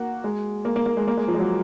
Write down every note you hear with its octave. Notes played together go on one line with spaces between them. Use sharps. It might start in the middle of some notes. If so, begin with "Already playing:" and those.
Already playing: A#3 F#4
G#3
A#3
A#3
A#3
G#3
A#3
G#3
F3
G#3
F#3